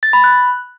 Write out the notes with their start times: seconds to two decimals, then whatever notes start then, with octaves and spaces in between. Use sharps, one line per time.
0.03 A6
0.13 B5
0.24 F#6